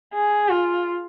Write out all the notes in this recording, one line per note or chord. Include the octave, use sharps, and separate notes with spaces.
G#4
F4